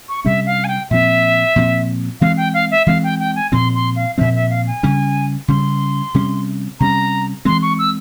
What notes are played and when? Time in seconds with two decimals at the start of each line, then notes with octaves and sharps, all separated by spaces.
0.09 C#6
0.25 C3 G3 C#4 E5
0.46 F5
0.64 G#5
0.68 G5
0.90 A#2 F3 C4 E5
1.56 A#2 F3 C4
2.21 E3 G#3 C4 F5
2.37 G5
2.54 F5
2.71 E5
2.87 E3 G#3 C4 F5
3.04 G5
3.20 G5
3.36 G#5
3.52 A#2 F3 C4 C6
3.75 C6
3.96 F5
4.18 A#2 F3 C4 E5
4.35 E5
4.50 F5
4.67 G#5
4.83 C#3 G3 C#4
5.48 C#3 G3 C#4 C6
6.15 C3 G3 C#4
6.80 C3 G3 C#4 A#5
7.45 E3 G#3 C4 C6
7.62 C#6
7.79 E6